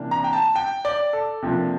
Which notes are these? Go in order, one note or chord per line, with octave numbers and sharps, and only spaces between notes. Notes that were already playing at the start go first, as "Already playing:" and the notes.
Already playing: C3 E3 A#3 D4
A#5
G5
A5
G5
D5
A4
C3 F3 A#3 D4